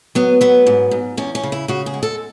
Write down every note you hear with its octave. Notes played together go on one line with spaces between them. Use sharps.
F#3 B3
F#3 B3
G#2
G#2
E2 C#4
C#4
C#3
E4
C#3 F#4
G#4
G#3
A4